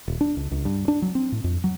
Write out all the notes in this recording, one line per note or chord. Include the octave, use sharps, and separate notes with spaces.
D#1
D4
C#2
C#2
G2
D4
F#3
C4
A2
F2
F#3